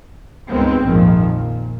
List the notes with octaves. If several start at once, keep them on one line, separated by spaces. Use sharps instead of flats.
C#2 G2 D#3 G#3 B3 C4
A#1 F2 G#2 D#3 F3
A#2